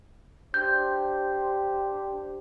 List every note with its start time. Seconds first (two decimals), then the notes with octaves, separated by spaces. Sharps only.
0.54 D4 G4 C5 G6